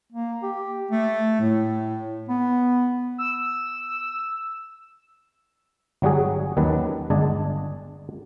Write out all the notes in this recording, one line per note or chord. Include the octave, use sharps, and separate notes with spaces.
A#3
G4
A3
A2
B3
E6
G1 F#3 G3 F#4 G#4
D#2 D#3 F#3 C#4 B4 A5
G1 G#3 D4 D#5 G#5 A5